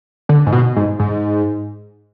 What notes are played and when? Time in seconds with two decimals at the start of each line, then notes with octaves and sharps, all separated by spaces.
0.29 D3
0.47 G#2
0.53 B2
0.76 G#2
0.99 G#2